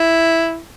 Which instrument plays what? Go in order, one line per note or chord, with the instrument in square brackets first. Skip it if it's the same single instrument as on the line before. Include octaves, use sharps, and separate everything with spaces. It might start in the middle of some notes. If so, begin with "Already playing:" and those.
Already playing: [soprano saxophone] E4